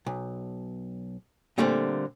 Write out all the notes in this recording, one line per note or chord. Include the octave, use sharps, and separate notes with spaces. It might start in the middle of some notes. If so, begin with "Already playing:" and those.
B1
A#2 D3 G3 A3 A#3 C4